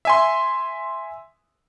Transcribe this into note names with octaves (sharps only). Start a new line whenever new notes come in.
E5 G#5 C6